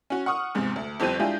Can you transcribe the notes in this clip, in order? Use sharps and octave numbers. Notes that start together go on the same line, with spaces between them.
C#4 F#4
F#5 C#6 D#6 F6
E2 G#2 C3
D2
G1 F2 F3 C4 G4 D#7
G#3 D4 E4 F4 G4 G#4